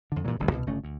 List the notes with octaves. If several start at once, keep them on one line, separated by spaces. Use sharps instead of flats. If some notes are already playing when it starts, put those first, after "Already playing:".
F2 D3
G2 A#2 E3 F#3
D1 A1 D3 G3
C2 B2
G1 C#3 A3 C#4
D2